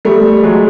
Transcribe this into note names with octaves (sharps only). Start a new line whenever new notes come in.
G3 A3
F#3 G#3